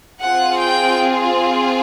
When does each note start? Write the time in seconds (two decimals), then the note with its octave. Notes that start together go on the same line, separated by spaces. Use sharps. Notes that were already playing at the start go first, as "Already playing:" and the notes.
0.22 C4 F4 G#4 F#5
0.60 G5